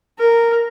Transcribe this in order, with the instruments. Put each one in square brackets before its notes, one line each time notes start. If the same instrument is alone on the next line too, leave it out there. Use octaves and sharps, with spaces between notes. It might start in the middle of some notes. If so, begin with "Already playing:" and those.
[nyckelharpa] A#4